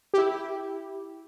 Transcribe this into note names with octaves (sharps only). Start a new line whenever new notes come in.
E4 G4